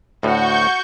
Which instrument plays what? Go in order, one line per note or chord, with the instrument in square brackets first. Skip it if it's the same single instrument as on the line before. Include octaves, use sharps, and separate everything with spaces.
[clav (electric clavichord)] D2 A2 [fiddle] F#4 F#5 [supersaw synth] C#6 G6